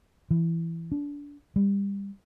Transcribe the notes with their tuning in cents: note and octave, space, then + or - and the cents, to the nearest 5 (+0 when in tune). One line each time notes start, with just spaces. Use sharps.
E3 +10
D4 -25
G3 +25